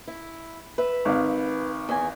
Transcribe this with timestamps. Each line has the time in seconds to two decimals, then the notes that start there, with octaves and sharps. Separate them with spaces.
0.08 E4
0.78 B4 E5
1.05 G#1 F5
1.89 E2 G#5